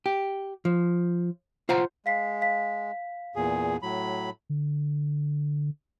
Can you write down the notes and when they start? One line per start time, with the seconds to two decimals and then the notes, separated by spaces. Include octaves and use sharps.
0.06 G4
0.65 F3
1.69 F4 C5 F#5 A#5
2.06 G#3 F5 B6 C7
2.41 F5 B6
3.36 E2 A#2 G#4
3.82 A2 F#3 B5
4.50 D3